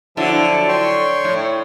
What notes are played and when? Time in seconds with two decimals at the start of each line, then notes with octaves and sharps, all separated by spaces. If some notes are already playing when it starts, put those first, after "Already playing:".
0.17 D3 F3 F#3 E4 A5
0.68 C#5 G5 C6 C#6
1.25 A2